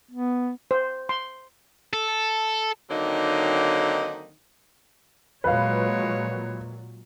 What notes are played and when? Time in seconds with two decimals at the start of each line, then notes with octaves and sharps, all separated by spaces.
0.11 B3
0.71 C5
1.09 C6
1.94 A4
2.90 D3 D#3 F#3 A#3 C4 D#4
5.44 A#2 F#3 G#3 B4 C#5 F5